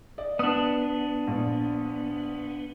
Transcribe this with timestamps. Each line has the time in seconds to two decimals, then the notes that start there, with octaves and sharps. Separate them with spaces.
0.18 D5 D#5
0.39 B3 D4 F#5 D#6
1.27 A#1